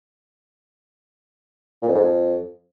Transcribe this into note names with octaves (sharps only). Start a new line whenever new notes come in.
A#2
F2
G#2
F2